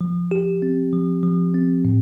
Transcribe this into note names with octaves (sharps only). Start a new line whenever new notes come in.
F3
G4
C4
F3
F3
C4
A2